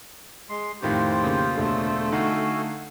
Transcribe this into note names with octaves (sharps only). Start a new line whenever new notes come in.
G#3 C6
F2 A2 D#3 F4 G4 C5
C#3 A#3
E1 D3 A3
D3 D#4 F#4 F5 F#5 G#5